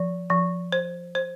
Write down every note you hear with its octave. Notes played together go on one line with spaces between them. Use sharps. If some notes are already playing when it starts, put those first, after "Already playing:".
Already playing: F3
F3
C5
C5